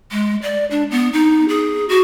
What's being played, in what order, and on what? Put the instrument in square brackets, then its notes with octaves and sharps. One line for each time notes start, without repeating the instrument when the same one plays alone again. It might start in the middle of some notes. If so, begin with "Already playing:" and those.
[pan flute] G#3
D5
D4
B3
D#4
G#4
F#4